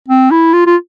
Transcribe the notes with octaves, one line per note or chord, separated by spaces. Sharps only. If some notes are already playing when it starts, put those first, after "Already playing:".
C4
E4
F4
F4